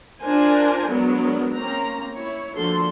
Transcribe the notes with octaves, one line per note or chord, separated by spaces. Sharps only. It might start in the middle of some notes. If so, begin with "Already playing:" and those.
D4 F4 A#4 C5 G#5
F#3 G#3 B3 D4 A#4
A#3 C4 C#4 A#5
E4 C#5
D3 F3 A#3 F#4 A4 C6